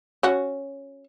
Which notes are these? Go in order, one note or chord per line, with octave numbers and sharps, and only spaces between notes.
C#4 F#4